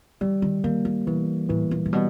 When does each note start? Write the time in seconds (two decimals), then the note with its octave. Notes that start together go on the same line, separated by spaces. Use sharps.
0.21 E3 G3
0.42 D#3
0.64 D#3 A#3
0.85 D#3
1.07 B2 E3
1.49 A2 E3
1.71 A#2
1.86 A#2
1.93 B2 G3